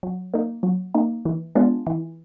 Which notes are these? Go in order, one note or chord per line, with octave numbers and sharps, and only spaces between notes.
F#3
A#3 D#4
F#3
A#3 D#4
E3
G#3 B3 D4 F4
E3